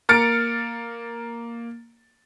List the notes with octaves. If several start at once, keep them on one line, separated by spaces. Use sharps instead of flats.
A#3 A#5 F6 A6 C#7 D7